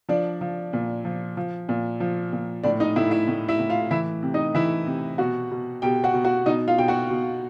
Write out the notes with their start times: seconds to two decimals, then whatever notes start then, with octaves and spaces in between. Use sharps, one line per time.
0.09 F3 D4 D5
0.41 F3
0.73 A#2
1.05 F3
1.37 F3
1.69 A#2
2.00 F3
2.33 A#2
2.63 A2 D4 D5
2.80 D#4 D#5
2.96 A2 E4 E5
3.11 E4 E5
3.28 A2
3.48 E4 E5
3.60 A2
3.70 F4 F5
3.91 E3 E4 E5
4.23 C3
4.34 D#4 D#5
4.54 E3 E4 E5
4.87 C3
5.18 B2 F#4 F#5
5.51 B2
5.82 B2 G4 G5
6.04 F#4 F#5
6.14 B2
6.24 F#4 F#5
6.46 B2 D#4 D#5
6.68 F4 F5
6.78 B2 G5
6.88 F#4 F#5
7.10 B2